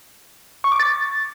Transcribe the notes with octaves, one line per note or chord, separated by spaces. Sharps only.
C#6
D6
A6